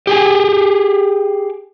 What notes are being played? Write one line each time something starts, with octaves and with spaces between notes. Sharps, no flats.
G4 G#4 G#5